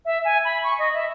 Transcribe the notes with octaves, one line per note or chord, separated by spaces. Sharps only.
E5
G#5
B5
C#6
D#5
E5